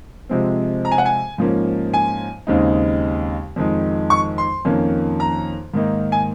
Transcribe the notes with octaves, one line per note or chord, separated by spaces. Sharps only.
C3 F3 G#3 C4
A#5
G#5
F#5
G#5
G#2 F3 A#3 C#4
G#5
D#2 C#3 G#3 C4 D#4
F2 D#3 G#3
C#6
C6
F2 D#3 A#3 C#4
A#5
G#2 D#3 A#3 D#4
G#5